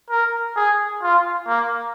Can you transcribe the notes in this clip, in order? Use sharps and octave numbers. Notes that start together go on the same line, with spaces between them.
A#4
G#4
F4
A#3